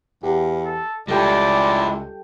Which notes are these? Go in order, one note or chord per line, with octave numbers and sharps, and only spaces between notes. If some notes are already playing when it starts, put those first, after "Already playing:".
E2 G4
A4
C#2 G3 G#3 E4 A4 D5 G5